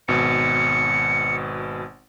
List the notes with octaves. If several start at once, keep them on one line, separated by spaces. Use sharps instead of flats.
G#1 B2 C#7